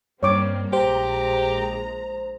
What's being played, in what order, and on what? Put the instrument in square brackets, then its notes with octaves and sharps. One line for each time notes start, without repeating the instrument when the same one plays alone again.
[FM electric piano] G2 [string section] G3 A#3 C4 [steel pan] C#5 D6
[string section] A#1 G#3 A#5 [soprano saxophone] G4 [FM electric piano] C5